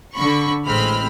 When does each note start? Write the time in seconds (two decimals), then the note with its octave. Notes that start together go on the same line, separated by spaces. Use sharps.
0.16 D3 B5 C#6
0.67 A1 G#3 C4 B5 F6